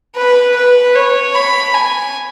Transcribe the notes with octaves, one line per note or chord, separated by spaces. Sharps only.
B4
B4
C#5
B5
G#5